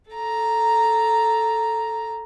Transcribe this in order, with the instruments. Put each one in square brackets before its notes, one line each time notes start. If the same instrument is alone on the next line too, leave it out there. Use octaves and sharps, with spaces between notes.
[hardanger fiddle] A4 A#5